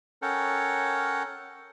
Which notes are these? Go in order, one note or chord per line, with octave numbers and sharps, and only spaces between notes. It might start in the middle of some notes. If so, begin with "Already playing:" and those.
C#4 A4 A#4 C#5 F#5 G5